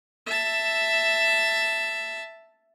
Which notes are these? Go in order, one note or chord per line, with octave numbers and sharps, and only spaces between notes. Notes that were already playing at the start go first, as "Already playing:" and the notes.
E5 A5